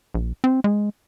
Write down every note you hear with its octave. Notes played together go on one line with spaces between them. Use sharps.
A#1
C4
G#3